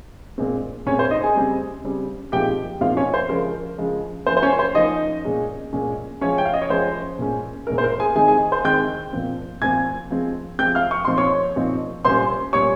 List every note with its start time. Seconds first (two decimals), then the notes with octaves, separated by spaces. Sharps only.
0.38 A#2 G#3 C4
0.86 A#2 G#3 C4 C#4 C#5
0.99 C5
1.11 D#4 D#5
1.23 G#4 G#5
1.35 C#3 G3 C4
1.84 C#3 G3 C4
2.32 A#2 F3 G#3 C4 D#4 G4 G5
2.81 A#2 F3 G#3 C4 D#4 F4 F5
2.97 C#4 C#5
3.14 C5
3.29 C#3 F3 G#3 A#4
3.78 C#3 F3 G#3
4.26 F3 A#3 C#4 C5
4.37 C5
4.43 C#4 C#5
4.59 C5
4.75 F3 A#3 C#4 D#4 D#5
5.25 A#2 G#3 C#4
5.73 A#2 G#3 C#4
6.21 F3 G#3 C#4 C#5
6.38 G5
6.45 F5
6.54 D#5
6.62 C#5
6.70 F3 G#3 C#4 C5
7.19 A#2 G#3 C#4
7.67 A#2 G#3 C#4 A#4
7.78 C5
7.84 A#4
8.00 G#4 G#5
8.15 D#3 G#3 C4 D#4 G#4 G#5
8.28 G#4 G#5
8.52 C5 C6
8.65 D#3 G#3 C4 D#4 G5 G6
9.13 A#2 F3 C4
9.62 A#2 F3 C4 G#5 G#6
10.10 F3 G#3 C4
10.59 F3 G#3 C4 G5 G6
10.75 F5 F6
10.91 C#6
11.05 A#2 F3 C4 D#4 C6
11.17 C#5 C#6
11.56 A#2 F3 C4 D#4
12.05 A#2 G3 C#4 C5 C6
12.53 A#2 G3 C#4 C#5 C#6